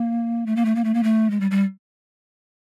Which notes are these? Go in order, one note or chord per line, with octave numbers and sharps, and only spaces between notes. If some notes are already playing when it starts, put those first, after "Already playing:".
Already playing: A#3
A3
A#3
A3
A#3
A3
A#3
A3
G#3
G3
G3